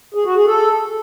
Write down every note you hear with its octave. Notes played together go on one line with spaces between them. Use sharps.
G#4
F#4
G#4
A4